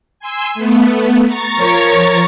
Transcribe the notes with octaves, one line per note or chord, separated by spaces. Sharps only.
G#5 C6 E6
A3 B3
A#5 C#6 A6
F3 A#4 C#5